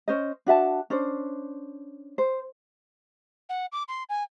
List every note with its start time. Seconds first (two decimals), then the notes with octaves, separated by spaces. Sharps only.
0.08 C#4 C5 D#5
0.46 D4 F#4 E5 A5
0.90 C#4 D4 C5
2.18 C5
3.49 F#5
3.72 D6
3.88 C6
4.09 G#5